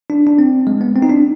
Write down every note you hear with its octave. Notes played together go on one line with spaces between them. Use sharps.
D4
D4
C4
G#3
B3
C4
D#4
D4